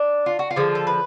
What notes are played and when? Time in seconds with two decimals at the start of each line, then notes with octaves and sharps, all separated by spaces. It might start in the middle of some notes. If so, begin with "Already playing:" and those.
Already playing: D4
0.26 F4
0.39 F#4
0.51 F4
0.56 D3 F3 G#3
0.75 A4
0.87 B4